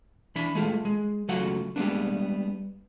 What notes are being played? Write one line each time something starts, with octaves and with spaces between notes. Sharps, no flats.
E3 D4 B5
G#3 A3 F4
G#3
C#2 F#3 A3 F4 F#4 F#5
G3 G#3 A#3 B3 D4